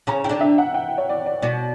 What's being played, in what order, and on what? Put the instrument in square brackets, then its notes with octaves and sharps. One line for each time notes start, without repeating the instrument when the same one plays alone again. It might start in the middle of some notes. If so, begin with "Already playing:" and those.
[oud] C#3 C#4 [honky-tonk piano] A#5
[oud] E4 [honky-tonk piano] G5
[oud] D3 D4
[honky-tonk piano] E5
F#5
G5
C#5
D5
D5
[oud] B2 B3 [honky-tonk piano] D5